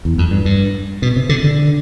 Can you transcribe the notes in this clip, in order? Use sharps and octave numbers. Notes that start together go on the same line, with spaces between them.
E2
F2
G2
G2
B2
C3
D3
D3